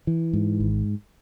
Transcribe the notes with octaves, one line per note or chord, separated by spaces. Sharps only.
E3
G#2
G#1